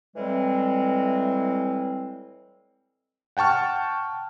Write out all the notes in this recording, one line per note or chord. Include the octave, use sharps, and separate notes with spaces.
A2 E3 G3 G#3 C4
F#5 G5 A5 C#6 F6